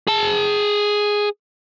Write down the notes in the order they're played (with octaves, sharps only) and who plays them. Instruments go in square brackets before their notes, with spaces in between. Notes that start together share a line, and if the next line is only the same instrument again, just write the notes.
[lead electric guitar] G#4 A5